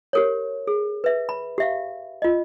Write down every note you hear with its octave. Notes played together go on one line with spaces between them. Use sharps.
G4 A#4 C#5
G#4
B4 E5
B5
G4 E5 F5
F4 D#5